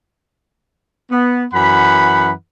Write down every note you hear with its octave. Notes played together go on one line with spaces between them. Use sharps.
B3
F#2 E3 F#5 B5